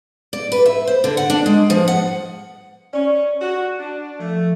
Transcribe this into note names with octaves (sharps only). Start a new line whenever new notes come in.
D5
B4
E5
C5
D3
F#5
D4
G#3
F3
F#5
C#4 D5
F#4
D4
F3 A3